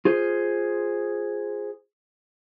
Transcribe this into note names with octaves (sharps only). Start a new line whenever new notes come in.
F4 G#4 C5